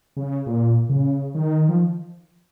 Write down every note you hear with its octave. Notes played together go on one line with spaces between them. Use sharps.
C#3
A#2
C#3
D#3
F3